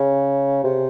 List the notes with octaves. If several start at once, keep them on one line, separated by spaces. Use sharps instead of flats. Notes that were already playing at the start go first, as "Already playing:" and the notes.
Already playing: C#3
C3